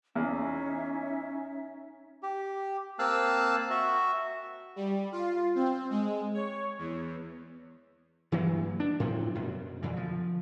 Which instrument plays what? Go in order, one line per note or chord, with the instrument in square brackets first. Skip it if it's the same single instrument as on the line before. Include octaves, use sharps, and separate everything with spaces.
[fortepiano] E2 [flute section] C#4 D#4 E5
[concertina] G4
A#3 C4 F5 A5 E6 F#6
F#4 E5
[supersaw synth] G3
F4
C4
G#3
C#5
E2
[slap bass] G2 E3 F#3 A#3
D4
A2 C3 F3 F#3
F#2 B2
F2 D3 E3
F3